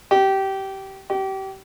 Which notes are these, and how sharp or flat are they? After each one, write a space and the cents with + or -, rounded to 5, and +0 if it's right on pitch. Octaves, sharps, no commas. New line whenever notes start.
G4 -20
G4 -30